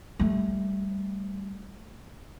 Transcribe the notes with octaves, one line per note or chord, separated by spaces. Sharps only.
G3 A3